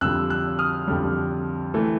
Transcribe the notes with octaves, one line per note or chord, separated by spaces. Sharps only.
F2 D3 G3 E6 F#6
E6 F#6
D#6 F6
F2 D3 G3
E3 A3